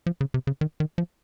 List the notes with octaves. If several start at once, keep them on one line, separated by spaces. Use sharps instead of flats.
F3
C#3
C3
C#3
D#3
D#3
F3